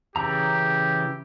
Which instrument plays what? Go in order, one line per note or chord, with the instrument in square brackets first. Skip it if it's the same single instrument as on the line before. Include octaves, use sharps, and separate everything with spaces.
[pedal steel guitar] C#3 E3 A#5 [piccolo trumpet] G4